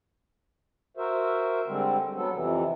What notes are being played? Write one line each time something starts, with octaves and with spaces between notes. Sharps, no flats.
F#4 A#4 C5 E5
D3 G3 G#3 C4
F#3 B3 A4
F2 C3 E3